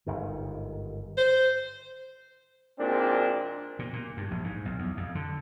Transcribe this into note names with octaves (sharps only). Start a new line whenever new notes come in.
G1 G#2 D#3
C5
G#1 A#2 C4 D4
A#2
A#2
G2
A#1
G#2
B1
E2
F2
D3